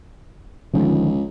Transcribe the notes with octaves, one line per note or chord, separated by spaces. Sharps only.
C#2 D3 D#3 F3